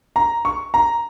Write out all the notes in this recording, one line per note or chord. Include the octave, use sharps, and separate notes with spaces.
A#5
C#6
A#5